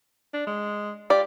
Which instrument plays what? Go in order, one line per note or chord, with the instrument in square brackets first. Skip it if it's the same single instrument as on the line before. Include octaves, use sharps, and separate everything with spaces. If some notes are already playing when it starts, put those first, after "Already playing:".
[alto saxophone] D4
G#3
[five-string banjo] F4 D5 [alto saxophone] G4